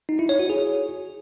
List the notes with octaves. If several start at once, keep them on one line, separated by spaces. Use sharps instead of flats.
D#4
E4
C#5
F#4
G#4